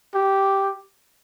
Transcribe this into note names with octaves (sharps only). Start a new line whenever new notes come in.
G4